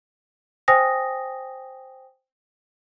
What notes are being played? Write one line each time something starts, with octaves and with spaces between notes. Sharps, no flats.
C5 G5 G#5 D#6 A#6